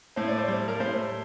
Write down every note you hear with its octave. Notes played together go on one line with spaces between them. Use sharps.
A2 C5
D5
C5
G3
A#4
A2 C5